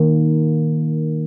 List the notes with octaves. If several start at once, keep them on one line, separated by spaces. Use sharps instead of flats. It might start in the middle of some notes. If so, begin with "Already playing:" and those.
Already playing: D#3 A#3